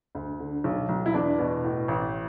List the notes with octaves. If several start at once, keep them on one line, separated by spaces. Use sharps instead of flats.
D2
D3
B1
B1
E4
E2 D4
B2
A2
A1